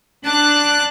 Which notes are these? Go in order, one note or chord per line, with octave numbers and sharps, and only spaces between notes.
D4 A5 F#6